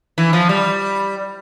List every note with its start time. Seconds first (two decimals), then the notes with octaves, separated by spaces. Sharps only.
0.18 E3
0.33 F3
0.49 G3